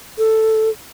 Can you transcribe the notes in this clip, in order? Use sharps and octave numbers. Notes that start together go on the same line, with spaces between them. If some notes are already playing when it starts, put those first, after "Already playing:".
A4